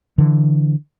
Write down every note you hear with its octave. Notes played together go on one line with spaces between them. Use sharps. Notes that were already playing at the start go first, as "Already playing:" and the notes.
D3 E3